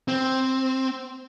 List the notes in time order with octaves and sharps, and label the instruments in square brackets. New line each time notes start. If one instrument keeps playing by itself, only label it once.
[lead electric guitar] C4